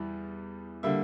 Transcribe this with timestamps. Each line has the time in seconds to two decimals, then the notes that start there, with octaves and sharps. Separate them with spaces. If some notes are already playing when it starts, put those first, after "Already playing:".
Already playing: E2 G3 E4
0.83 D3 G3 A#3 E5